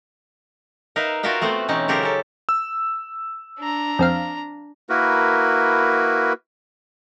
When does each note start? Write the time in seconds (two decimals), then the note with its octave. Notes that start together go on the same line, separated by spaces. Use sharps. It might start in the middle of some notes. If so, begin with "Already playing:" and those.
0.96 D#4 A#4 B4 E5 F5
1.23 F4 F#4 A#4 E5 F5 G5
1.41 A3 B3 C4 C5
1.68 B2 E3 C4 C#4 D#4
1.88 C#3 F#3 G4 A4 A#4 C5
2.03 C#4 A4
2.49 E6
3.59 D4 A#5
3.99 F2 C4 F5
4.89 A#3 E4 F#4 A#4 B4